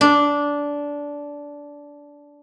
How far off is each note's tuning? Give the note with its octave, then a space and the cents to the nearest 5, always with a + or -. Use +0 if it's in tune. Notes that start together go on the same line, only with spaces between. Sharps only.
D4 -15